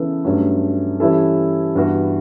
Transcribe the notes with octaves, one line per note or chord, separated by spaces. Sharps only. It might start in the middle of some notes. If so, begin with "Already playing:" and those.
Already playing: C#3 E3 B3 E4 A4
G2 F#3 A3 C#4
E3 G3 C#4 E4 A4
G2 E3 B3 F#4 B4